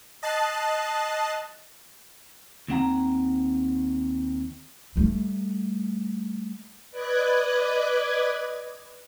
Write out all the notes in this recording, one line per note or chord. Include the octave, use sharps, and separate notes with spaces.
D#5 A5 F#6 A6 C7
D#2 C4 F#5 A#5
G3 A3
B4 D5 D#5 D6 F#6 G#6